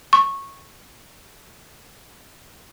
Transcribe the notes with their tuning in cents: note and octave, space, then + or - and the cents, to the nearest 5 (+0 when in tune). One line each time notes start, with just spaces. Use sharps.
C#6 -10